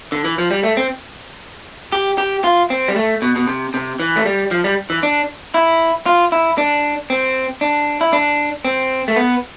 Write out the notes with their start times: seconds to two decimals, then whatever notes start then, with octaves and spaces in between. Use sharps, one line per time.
0.12 D3
0.24 E3
0.38 F3
0.51 G3
0.63 A3
0.77 C4
1.92 G4
2.18 G4
2.44 F4
2.70 C4
2.88 G3
2.96 A3
3.22 B2
3.36 B2
3.47 C3
3.74 C3
4.00 E3
4.16 A3
4.26 G3
4.51 F3
4.64 G3
4.90 E3
5.03 D4
5.54 E4
6.06 F4
6.32 E4
6.58 D4
7.10 C4
7.61 D4
8.01 E4
8.13 D4
8.65 C4
9.08 A3
9.16 B3